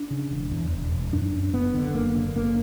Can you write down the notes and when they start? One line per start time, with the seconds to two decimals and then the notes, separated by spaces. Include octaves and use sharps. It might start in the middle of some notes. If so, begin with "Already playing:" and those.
Already playing: D4
0.11 C#3
0.31 E1
0.51 E2
0.71 E1
0.92 E1
1.13 F#2 D4
1.34 F#2
1.53 F#1 B3
1.74 D3
1.95 F#1 A#3
2.16 D3
2.36 F#1 A#3